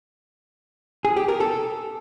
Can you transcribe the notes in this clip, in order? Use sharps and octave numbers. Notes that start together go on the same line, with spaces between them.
G#4
G4
A#4
A4